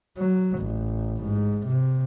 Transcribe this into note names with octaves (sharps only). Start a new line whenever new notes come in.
F#3
A1
G#2
C3